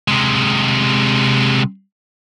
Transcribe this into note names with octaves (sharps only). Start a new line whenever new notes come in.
C3 G#3